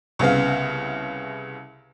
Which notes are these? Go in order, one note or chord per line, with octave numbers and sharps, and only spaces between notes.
C2 C#3 B3 F5